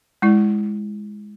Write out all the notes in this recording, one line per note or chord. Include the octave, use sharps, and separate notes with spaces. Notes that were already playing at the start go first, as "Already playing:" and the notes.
G#3 E4 D5